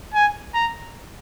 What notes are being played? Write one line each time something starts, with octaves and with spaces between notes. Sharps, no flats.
G#5
A#5